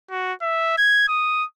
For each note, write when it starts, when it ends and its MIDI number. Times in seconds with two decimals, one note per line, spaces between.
0.11 0.33 66
0.42 0.78 76
0.78 1.07 92
1.08 1.44 87